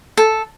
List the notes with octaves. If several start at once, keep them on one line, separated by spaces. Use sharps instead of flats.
A4